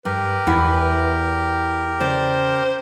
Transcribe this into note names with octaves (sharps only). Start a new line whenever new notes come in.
G2 G4 A#4 B4
E2 E4 F#5
C#3 C5 D5